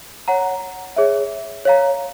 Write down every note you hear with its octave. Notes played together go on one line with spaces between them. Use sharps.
C#5 F#5 A#5
G#4 C#5 E5
C#5 F5 A#5